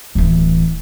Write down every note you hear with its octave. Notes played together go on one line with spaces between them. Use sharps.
D1 E3